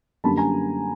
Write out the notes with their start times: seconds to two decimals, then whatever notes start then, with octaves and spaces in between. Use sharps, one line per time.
0.24 F#2 D3 G3 A#3 A5 B5
0.37 G#5 A#5